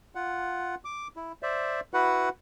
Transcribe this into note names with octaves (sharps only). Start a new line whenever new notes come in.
F4 F#5
D6
E4
C5 D5 E5
E4 F#4 B4 F#5